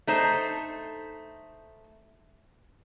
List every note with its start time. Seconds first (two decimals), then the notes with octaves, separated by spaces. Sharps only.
0.07 A3 D#4 C5 A5